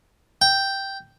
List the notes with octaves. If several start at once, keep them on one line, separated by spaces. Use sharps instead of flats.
G5